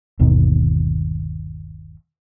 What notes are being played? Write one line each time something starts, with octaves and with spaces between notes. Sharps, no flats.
G1 D#2 B2 D#3